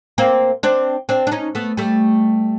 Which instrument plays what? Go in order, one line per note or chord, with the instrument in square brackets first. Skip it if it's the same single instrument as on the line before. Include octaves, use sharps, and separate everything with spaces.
[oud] A#3 C4
C4 D4
C4 D4
D4
C#4 D#4
A3 B3
G3 A3